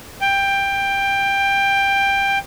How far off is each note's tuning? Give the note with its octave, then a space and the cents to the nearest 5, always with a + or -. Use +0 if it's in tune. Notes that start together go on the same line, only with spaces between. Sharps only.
G5 +15